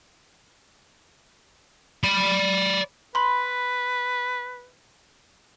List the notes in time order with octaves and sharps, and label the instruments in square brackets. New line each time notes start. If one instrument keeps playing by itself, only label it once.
[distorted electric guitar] D5 B5
[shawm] B4 [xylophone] B5 C6